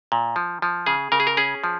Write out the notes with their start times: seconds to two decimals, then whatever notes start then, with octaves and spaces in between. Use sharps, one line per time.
0.12 A#2
0.36 F3
0.62 F3
0.86 C#3 G#4
1.12 C#3 A#4
1.20 G#4
1.27 A#4
1.37 C#4 G#4
1.64 F3